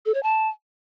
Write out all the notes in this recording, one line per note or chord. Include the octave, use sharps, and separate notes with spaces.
A4
C#5
A5